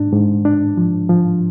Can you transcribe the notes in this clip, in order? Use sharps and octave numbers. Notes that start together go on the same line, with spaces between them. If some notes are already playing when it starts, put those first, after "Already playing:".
Already playing: G#2 D4
G#2
D4
F3
F3